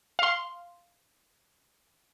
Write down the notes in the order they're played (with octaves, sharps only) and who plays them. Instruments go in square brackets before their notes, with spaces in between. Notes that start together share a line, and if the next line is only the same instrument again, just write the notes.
[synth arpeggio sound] F5 C6